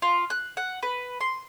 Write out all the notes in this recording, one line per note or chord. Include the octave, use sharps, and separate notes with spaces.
F4
F#6
F#5
B4
C6